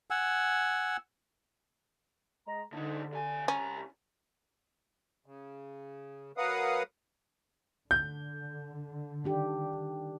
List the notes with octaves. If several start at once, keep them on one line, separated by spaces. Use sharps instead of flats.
F#5 G#5 E6
G#3 A#5
A2 D3 D#4
C3 G#5
C2 C#4 A#5
C#3
F#3 A#4 B4 F5 F#5 D#6
D3 G6
D#3 D4 G4